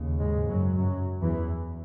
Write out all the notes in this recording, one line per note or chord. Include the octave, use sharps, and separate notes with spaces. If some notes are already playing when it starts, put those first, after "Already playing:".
Already playing: D#2 C#3
G#2 G#3
F#2 F#3
F#2 F#3
E2 E3